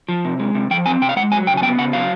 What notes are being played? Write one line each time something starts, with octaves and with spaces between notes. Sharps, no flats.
F3
C3
G#3
C3
F3 G5
C4 G#5
C3 G5
F5
G#3 F#5
F#3 G#5
C#3 G5
G#5
B3 G5
C#3 F#5
F#3 F5